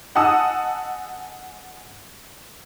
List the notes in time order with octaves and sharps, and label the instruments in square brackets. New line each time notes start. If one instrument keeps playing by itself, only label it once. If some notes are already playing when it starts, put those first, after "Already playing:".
[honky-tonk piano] D#5 F#5 G#5 A5 D#6 E6